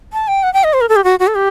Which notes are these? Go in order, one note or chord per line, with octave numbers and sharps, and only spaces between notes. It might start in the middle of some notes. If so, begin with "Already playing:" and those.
A5
G5
F#5
G5
D#5
C5
A#4
A4
G4
F#4
F#4
A4
G4